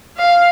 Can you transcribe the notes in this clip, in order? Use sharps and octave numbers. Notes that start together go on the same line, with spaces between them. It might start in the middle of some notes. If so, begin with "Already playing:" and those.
F5